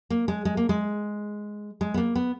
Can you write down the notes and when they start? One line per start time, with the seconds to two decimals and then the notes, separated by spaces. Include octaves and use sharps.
0.10 A#3
0.28 G#3
0.45 G#3
0.57 A#3
0.69 G#3
1.81 G#3
1.94 B3
1.98 A#3
2.16 B3